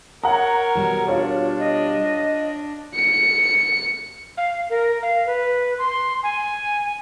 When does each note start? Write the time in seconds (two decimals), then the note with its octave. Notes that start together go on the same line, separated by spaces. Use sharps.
0.24 A#4 C#5 F#5 A#5
0.75 B2 G3 F#4
1.08 D4 F4 C#5
1.59 D#5
2.95 C#7
4.37 F5
4.70 A#4
5.02 F5
5.26 B4
5.78 C6
6.23 G#5